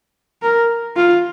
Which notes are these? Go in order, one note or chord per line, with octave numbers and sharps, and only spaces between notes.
A#4
F4